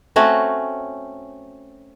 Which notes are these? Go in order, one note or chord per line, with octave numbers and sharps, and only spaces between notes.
A3 C4 C#4 F#4